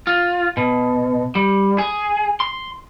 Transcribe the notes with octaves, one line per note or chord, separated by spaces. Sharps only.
F4
B2
G3
G#4
C6